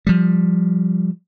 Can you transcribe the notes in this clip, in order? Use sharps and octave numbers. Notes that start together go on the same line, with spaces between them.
F3 G3